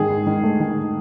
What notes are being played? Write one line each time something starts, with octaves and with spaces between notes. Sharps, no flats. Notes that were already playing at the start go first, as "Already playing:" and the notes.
Already playing: G#2 D#3 G#4
G#2
D#3
A3
D#3